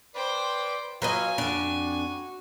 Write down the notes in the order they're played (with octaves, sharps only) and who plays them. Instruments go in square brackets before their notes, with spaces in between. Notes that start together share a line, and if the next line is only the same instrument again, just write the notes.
[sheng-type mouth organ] B4 D5 [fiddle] C5 G5
[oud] F#3 B4 D#5 [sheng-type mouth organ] F4 C#5 F5 [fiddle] G#5
[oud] F2 D4 [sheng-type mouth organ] F#4